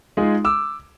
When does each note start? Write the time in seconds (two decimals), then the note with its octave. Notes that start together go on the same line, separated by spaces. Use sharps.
0.17 G#3 D#4 F4 G#4
0.45 D6 E6